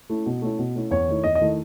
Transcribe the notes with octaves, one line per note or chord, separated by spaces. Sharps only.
A3 C#4 E4
B2
A3 C#4 E4
B2
A3 C#4 E4
E2 C#5
D#3 A3 E4
E2 D#5
D#5
D#3 A3 E4